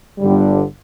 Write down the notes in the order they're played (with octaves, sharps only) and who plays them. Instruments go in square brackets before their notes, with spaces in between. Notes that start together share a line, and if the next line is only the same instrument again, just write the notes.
[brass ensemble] G1 G2 D3 G3